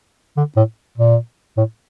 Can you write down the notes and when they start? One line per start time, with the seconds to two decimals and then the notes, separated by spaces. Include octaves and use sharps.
0.37 D3
0.57 A2
0.98 A#2
1.57 A2